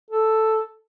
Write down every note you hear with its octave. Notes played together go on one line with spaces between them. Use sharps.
A4